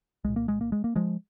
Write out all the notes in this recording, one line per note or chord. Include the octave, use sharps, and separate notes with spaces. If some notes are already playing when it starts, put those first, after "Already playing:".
C2 A#2 G#3
A#3
G#3
A#3
G#3
A#3
F3 G#3